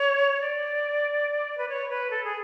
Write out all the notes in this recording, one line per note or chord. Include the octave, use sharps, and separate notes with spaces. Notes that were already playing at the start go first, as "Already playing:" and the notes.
Already playing: C#5
D5
B4
C#5
B4
A4
G#4